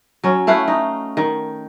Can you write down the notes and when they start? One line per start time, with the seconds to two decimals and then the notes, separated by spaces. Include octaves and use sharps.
0.24 F#3 C#4
0.47 A3 E4 F5 F#5
0.68 D#4
1.17 D#3